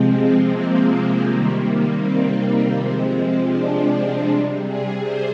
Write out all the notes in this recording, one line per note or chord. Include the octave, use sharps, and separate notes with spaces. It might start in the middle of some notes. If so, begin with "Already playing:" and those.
Already playing: C3 F3 G#3 C4
A#3
C3 D#3 G3
C4
C3 F3 G#3
D4
C3 G3
G#4
C5